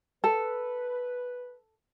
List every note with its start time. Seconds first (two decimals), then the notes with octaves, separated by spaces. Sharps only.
0.24 A4 B4